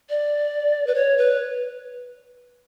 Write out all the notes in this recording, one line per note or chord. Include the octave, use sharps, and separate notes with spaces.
D5
B4
C#5
B4